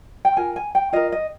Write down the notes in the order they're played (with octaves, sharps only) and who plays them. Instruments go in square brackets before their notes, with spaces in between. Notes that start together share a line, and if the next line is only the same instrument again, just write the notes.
[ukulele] G5
F4 A#4 G#5
G#5
G5
F4 A#4 D#5
D#5